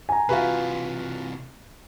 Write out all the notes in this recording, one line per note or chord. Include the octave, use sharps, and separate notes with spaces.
G#5 A#5
C3 E3 F4 F#4 B4